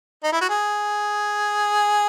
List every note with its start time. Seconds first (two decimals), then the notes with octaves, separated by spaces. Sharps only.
0.24 D#4
0.32 E4
0.41 F#4
0.49 G#4